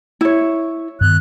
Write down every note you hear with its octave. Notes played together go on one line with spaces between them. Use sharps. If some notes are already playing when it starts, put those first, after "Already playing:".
E4 C#5
G2 D#3 B3 F#6